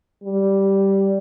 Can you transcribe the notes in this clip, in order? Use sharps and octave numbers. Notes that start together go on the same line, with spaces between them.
G3